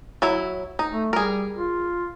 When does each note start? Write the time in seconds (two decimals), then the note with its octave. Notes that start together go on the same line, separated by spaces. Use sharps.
0.22 F#3 E4
0.79 D#4
0.92 A3
1.13 G3 G#4 A#4
1.56 F4